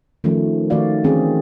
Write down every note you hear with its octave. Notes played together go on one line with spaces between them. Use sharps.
D#3 F3 A3 C#4
D#3 A3 F#4 D5 F5
D#3 E3 C4 C#4 G#4